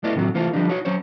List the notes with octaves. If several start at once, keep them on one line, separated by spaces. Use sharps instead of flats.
A3 B3 E4 D5 D#5
A2 C3 D#3 F#3 F#4
C2 E3 A3 F4 C5
D3 F3 G3 D4 D#4
D#4 F#4 C#5
F#3 C#4 C5 C#5